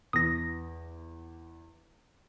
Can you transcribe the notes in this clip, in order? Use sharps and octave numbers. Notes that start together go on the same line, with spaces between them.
E2 D#6 A#6